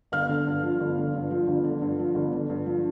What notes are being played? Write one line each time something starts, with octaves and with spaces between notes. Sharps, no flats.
G1 F5 F6
D3
G2
F3
G1
D3
G2
F3
G1
D3
G2
F3
G1
D3
G2
F3